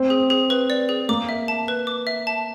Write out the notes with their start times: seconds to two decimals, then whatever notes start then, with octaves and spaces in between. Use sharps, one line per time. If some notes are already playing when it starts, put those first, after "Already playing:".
Already playing: C4
0.10 G#4
0.30 G#4
0.50 B4
0.70 D5
0.89 G#4
1.09 A#3 D6
1.29 E5
1.48 A5
1.68 B4
1.87 D6
2.07 E5
2.27 A5